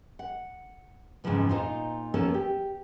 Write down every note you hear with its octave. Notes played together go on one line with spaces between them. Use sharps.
F#5
F2 G#2 C#3 E3 F3 B3
A#2 D#4 F4 C5 D#5 F5
F3 A#3 B3 C#4 A4
G4